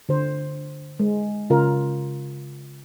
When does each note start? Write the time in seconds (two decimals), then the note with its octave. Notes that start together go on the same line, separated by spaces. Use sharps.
0.09 D3 C5
1.00 G#3
1.50 C#3 F4 A#4